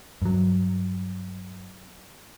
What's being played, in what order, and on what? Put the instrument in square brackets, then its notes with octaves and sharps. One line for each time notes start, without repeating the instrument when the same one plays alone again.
[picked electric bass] G2 F#3